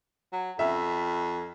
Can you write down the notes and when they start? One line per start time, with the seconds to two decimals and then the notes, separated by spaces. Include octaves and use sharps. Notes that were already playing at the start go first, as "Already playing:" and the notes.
0.33 F#3
0.59 F2 E5